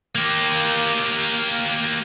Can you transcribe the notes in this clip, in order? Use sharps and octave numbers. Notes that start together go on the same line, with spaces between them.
A#3 G4